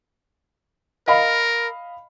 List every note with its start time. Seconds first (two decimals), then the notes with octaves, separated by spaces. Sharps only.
1.08 A#4 D#5 F5 B5